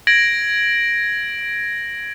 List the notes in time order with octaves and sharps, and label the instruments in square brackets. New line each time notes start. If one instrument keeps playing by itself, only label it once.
[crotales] G#6 A#6 D7 F#7